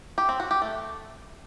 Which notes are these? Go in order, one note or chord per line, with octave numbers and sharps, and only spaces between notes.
G4
C4
F#4
G4
A3